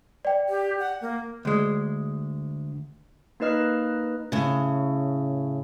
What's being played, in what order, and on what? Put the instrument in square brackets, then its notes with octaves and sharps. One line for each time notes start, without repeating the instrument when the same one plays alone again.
[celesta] D5 G5
[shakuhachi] G4
F#5
A#3
[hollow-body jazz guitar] D2 G#3
[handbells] A#3 D#4 B4 D#5 F6 F#6
[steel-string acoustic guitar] A2 C#3